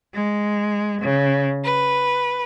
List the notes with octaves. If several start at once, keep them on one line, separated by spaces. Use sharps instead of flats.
G#3
C#3
B4